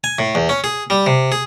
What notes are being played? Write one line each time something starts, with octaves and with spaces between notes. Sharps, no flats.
G#5
A2
E2
C#4
G#4
G3
C3
G#4